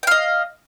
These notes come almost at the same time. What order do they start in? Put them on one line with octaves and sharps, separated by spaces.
G5 F5 D#5